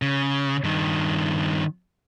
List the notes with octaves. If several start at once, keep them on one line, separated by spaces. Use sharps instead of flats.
C#3
G2 D#3